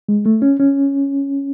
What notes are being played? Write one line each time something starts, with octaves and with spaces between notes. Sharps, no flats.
G#3
A3
C#4
C#4